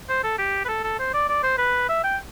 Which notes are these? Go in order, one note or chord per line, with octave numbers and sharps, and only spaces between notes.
C5
A4
G4
B4
A4
A4
C5
D5
D5
C5
B4
E5
G5